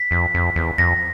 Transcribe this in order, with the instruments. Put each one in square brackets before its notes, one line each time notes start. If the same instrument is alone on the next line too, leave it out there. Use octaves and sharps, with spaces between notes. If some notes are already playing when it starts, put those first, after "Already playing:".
Already playing: [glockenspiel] B6
[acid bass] F2
F2
E2
[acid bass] F2 [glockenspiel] A#6